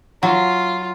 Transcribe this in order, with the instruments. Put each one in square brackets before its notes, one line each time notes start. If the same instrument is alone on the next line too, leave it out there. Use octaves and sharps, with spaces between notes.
[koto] F#3 [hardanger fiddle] F4